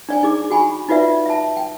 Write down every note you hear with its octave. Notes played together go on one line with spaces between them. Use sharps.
D4 D5 G#5
D#4 G#4 D6
F#4 G#5 B5 C#6
D#4 F4 F#4 B4 D5 E5
E5 A5
G5